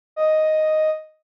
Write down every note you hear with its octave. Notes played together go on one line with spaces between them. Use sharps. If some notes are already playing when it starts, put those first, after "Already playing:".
D#5